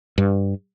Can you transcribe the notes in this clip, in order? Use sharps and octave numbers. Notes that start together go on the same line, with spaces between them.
G2